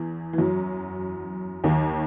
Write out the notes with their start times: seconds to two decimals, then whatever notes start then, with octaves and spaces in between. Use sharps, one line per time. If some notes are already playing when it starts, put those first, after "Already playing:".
Already playing: E2 E3
0.33 E3
0.38 F#2 F#3
1.64 D#2 D#3